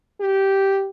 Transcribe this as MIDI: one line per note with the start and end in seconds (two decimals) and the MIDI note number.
0.21 0.89 67